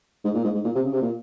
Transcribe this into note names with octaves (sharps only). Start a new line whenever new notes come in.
G#2
A#2
G#2
G#2
A#2
C3
C#3
C3
A#2